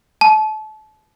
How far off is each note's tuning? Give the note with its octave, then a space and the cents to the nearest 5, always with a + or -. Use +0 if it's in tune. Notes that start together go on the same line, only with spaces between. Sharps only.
A5 -30